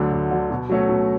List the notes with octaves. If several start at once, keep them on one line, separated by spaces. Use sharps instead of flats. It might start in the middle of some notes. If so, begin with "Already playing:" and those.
Already playing: D2 D3 F#3
D2
D3 F#3
B2
F#3 A3 C#4 F#4
B2